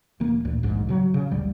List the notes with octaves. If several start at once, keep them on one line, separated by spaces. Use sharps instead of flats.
D#1 E3 A#3
D2 A#2
A#1 D#2 G#2
C#3 E3 F#3
C#3
A1 D#2 D3 G3